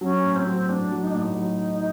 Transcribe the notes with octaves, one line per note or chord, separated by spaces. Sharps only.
F#3 C#4
A2
C4
F#3
A2 D4
F#3
D#4
D4
A2 D#4
F#3